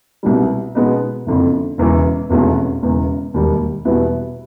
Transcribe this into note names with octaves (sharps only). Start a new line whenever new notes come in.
C2 B2 G3
B2 G#3 B3 D#4
F#1 F2 D3
E1 E2 C#3 E3
F1 E2 B2 G#3 C#4
E1 E2 C#3
E1 D#2 D#3 G3
E2 B2 G3 B3 E4